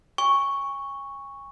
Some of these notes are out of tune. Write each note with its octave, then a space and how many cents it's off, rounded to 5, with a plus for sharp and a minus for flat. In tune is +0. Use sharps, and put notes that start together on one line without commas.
G#5 -35 C#6 +0